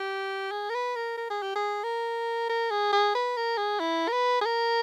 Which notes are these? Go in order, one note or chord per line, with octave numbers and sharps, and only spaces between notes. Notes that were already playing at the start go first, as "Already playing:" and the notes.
Already playing: G4
G#4
A#4
B4
A#4
A#4
G#4
G4
G#4
A#4
A#4
G#4
G#4
B4
A#4
G#4
E4
A#4
B4
G#4
A#4